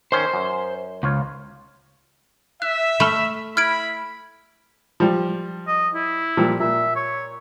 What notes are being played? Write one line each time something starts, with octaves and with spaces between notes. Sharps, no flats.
D#3 C#4 C5 C6
F#2
C#2 F4 C#5
E5 F#6
A3 B5 F6
E4 B5 F6 G#6 D7
F3 G3
D#5
E4
A#2 F3 G3
A#2 E5
C#5